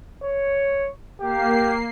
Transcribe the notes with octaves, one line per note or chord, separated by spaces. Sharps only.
C#5
A#3 G4 C7